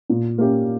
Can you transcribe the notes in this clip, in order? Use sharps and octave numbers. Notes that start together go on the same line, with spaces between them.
A#2
A#3 C#4 G4